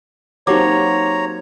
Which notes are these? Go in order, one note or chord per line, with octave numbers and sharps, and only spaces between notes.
F#3 A#3 C4 D#4 G4 C#5 A#5 D6